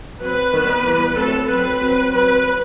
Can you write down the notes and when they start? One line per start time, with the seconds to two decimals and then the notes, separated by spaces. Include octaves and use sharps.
0.20 F#3 C4 B4
0.52 D#3 G3 B3
0.84 E3 G3 B3
1.16 F#3 A3 C4 A4
1.48 F#3 C4 B4
1.80 F#3 C4
2.13 F#3 C4 B4